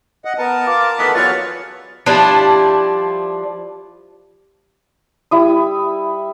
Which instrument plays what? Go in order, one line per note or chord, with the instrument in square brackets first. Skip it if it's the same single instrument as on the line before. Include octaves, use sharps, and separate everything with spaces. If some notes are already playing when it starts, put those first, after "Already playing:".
[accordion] D#5 F#5
[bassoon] B3 [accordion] A#4 A5
[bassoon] F4 [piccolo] D6
[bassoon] D#3 [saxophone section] E3 A3 B3 [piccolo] B6
[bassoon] E2 [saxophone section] E3 F#3 F4 [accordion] B3 C#6 [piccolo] A6
[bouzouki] F3 G3 D4 E4
[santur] G3 E4 D#6